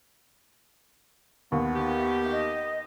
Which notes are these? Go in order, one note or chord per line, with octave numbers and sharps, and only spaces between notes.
D#2 B3
D#3 G4
E5
D#5